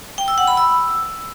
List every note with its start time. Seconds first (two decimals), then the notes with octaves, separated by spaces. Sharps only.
0.18 G5
0.28 E6
0.38 F#5
0.48 B5
0.57 E6